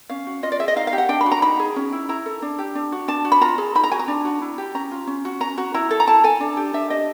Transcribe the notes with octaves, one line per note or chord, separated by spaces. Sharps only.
C#4 F5
F#4
F4 D#5
D5
G#4 E5
D#5
D#4 F5
F5
G4
F#5
D4 G5
B5
F#4
A#5
D#4 B5
G#4
C#4
E4
E4 A#5
A4
D4
G4
D4
F#4
D4 A5
F#4
B5
F4 A#5
G#4
D#4 B5
A#5
F#4 G#5
A#5
D4
F#4
E4
G4
C#4 A#5
F4
C#4
F#4
C#4 A#5
F#4
E4 A#5
A4
A#5
E4 A5
A4 G#5
D4
G4
D4 E5
G4 D#5